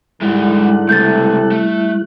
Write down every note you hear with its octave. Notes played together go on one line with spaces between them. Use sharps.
G#2 D3 G3 G#3 E4 G4 F#6
C#2 C3 A3 A4 G6 A6
A3